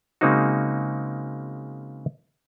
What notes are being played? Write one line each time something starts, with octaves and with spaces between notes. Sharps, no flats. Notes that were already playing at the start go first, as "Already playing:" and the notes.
C#3 G#3 A#3 C4 D#4 F#4